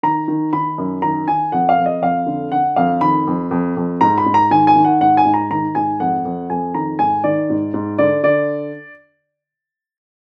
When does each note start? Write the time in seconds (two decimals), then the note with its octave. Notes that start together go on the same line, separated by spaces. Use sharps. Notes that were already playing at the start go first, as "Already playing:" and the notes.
0.03 D#3 A#5
0.28 D#3
0.53 D#3 B5
0.78 F#2
1.02 D#3 A#5
1.28 D#3 G#5
1.52 F2 F#5
1.69 F5
1.78 F2
1.86 D#5
2.02 F2 F5
2.26 D3
2.52 D3 F#5
2.76 F2 F5
3.01 D#3 B5
3.27 F2
3.51 F2
3.77 F2
4.01 G#2 A#5
4.18 B5
4.26 G#2
4.34 A#5
4.51 D#3 G#5
4.67 G#5
4.76 D#3
4.85 F#5
5.01 G#2 F#5
5.17 G#5
5.25 G#2
5.34 A#5
5.51 D#3 A#5
5.75 G#2 G#5
6.00 F2 F#5
6.25 F2
6.50 F2 G#5
6.74 D#3 A#5
6.99 G#2 G#5
7.24 D#3 D5
7.50 G#2
7.74 G#2
7.98 D3 D5
8.23 D3 D5